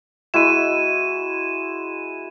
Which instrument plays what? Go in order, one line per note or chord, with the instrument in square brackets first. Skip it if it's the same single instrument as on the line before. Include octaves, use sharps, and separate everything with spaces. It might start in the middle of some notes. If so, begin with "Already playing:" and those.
[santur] G#3 E4 F#4 [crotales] D#7 E7